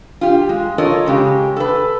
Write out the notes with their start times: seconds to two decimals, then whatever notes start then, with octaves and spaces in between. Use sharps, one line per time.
0.21 F4 G4
0.49 G#3
0.78 F4 A4 A#4 C#5 D#5
1.06 C#3 G#3 G4
1.56 A4 B4